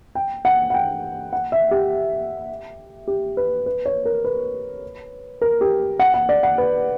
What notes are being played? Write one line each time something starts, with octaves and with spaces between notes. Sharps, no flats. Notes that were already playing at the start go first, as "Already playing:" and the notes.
G5
F#5
F#5
G5
F#5
E5
G4
G4
B4
B4
C#5
A#4
B4
A#4
G4
F#5
F#5
D5
F#5
B4